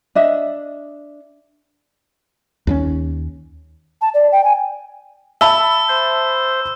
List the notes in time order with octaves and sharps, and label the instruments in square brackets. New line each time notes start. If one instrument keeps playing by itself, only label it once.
[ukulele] D4 D#5 E5
[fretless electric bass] D#2 G3 C#4
[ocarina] A5
D5
G5
G#5
[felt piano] E5 A5 B5 [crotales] E6
[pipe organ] C5